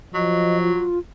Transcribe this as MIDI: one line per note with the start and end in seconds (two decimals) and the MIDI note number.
0.14 0.76 53
0.14 0.89 54
0.14 0.58 75
0.63 0.99 65